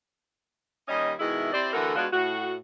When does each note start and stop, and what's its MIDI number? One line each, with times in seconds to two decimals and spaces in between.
0.88 1.12 39
0.88 1.12 55
0.88 1.12 61
0.88 1.12 75
1.19 1.53 47
1.19 1.53 51
1.19 1.53 56
1.19 1.53 64
1.53 1.71 60
1.53 1.71 64
1.53 1.71 67
1.53 1.71 72
1.53 1.71 74
1.73 1.94 50
1.73 1.94 52
1.73 1.94 57
1.73 1.94 66
1.73 1.94 69
1.73 1.94 70
1.95 2.06 56
1.95 2.06 59
1.95 2.06 62
1.95 2.06 65
1.95 2.06 66
2.12 2.55 45
2.12 2.55 66